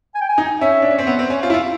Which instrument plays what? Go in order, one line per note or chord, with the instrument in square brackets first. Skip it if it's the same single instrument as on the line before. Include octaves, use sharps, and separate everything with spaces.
[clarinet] G#5
G5
G#5
[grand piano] D#4
[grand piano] C#4 [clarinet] E5
[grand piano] D4
C#4
C4
B3
C4
C#4
F4
E4
F4